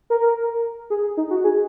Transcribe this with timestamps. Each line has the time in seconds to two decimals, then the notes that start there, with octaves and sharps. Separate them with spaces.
0.10 A#4
0.90 G#4
1.17 D#4
1.30 F#4
1.44 G#4